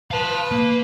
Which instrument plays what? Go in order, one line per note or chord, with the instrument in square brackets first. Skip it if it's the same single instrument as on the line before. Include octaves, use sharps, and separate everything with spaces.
[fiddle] B4 [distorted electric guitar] F5 A5
[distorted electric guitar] A#3